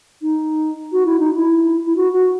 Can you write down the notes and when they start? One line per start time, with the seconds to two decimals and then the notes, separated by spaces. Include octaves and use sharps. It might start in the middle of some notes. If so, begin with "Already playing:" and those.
0.21 D#4
0.92 F#4
1.05 E4
1.19 D#4
1.33 E4
1.86 E4
1.95 F#4
2.12 F#4